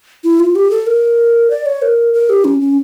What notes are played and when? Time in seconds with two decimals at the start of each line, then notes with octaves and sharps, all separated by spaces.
0.24 E4
0.40 F4
0.55 G4
0.71 A4
0.87 A#4
1.50 D5
1.66 C#5
1.82 A#4
2.14 A#4
2.29 G4
2.45 C#4
2.61 C#4